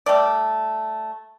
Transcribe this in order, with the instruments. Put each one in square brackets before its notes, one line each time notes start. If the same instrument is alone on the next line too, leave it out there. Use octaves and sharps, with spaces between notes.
[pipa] G3 A3 D5